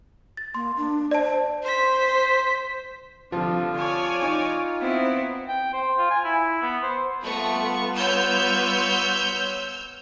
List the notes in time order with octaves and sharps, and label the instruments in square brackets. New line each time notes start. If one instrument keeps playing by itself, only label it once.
[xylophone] A6
[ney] A#3 [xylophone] C6
[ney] D4
[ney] C5 [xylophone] D5 A5
[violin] C5 B6
[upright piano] C2 F3 [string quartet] D3 [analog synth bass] F4
[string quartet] C#5 D5 G#5
[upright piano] D#4 D#5 C#6
[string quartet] B3 C4 E4
[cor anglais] G5
C5
F4
G#5
E4
B3
C5
[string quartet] G3 B3 F4 [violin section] A3 [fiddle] B4 C#6
[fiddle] B4 C#5 [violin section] E6 F6 G6